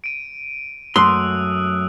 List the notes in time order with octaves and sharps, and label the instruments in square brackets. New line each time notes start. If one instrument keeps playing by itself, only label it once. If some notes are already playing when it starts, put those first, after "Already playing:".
[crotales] D7 D#7
[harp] F#2 F#3 A3 [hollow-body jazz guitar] C6 [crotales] D#6 E6 F#6